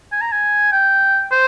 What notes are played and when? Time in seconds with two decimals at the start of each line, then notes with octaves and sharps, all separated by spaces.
0.12 G#5
0.21 A#5
0.32 G#5
0.72 G5
1.31 C5